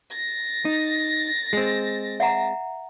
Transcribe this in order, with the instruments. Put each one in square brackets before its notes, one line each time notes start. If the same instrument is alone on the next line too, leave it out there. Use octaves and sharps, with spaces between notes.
[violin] A6 A#6
[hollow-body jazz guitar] D#4
G#3 C4
[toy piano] E5 F#5 A#5